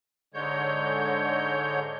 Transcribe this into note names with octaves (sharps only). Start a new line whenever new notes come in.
G#2 D3 G#3 C#5 G6